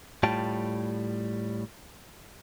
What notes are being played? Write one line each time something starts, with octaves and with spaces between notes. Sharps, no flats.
A2 G3 F4 G5 A5